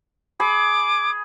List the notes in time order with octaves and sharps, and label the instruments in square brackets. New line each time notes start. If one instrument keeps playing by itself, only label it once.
[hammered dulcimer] G#4 B5 [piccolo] D6